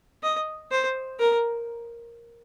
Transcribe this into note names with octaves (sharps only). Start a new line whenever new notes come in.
D#5
C5
A#4